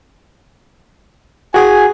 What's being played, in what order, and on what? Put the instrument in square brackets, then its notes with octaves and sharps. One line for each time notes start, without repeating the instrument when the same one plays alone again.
[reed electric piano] F#4 G#4 F#5 [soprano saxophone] G#5